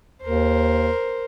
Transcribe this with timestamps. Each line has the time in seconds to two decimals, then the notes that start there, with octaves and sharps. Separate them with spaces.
0.23 D#2 A#4 C5